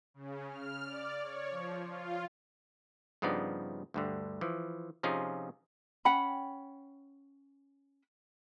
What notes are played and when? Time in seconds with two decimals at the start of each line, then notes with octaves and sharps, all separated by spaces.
0.14 C#3
0.48 F6
0.85 D5
1.20 C#5
1.50 F3
1.83 F4
3.22 G2 C#3 F3 B3 D#4 D5
3.94 D2 G2 D3
4.41 E3 F3
5.03 C3 F3 C#4 D#4 F4 G#4
6.05 C#4 F#5 G5 B5